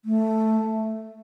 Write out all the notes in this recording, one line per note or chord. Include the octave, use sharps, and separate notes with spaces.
A3